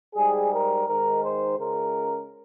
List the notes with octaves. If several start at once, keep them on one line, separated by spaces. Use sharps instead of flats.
G#2 G3 G#4
A#4
G#2 D#3 G#3 A#4
C5
C#2 C#3 G#3 A#4